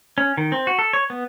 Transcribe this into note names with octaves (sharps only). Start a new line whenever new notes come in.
C#4
D#3
C4
F#4
A4
C#5
B3